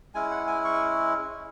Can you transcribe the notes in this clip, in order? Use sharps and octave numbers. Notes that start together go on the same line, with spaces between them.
G#3 C#4 E4 G#5
F#5
G#5
C#6